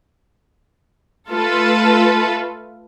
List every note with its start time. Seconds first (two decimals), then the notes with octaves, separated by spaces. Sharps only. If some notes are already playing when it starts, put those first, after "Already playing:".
1.30 A3 F4 A4 B4